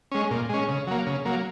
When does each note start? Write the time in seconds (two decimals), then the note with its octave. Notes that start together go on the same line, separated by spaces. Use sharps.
0.12 G#3 C#4
0.31 A#2
0.49 G#3 C#4
0.68 C#3
0.87 F#3 A#3
1.06 C#3
1.25 F#3 A#3